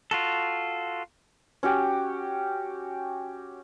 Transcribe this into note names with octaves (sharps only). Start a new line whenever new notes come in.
F4 F#4 A4
C#4 F#4 G4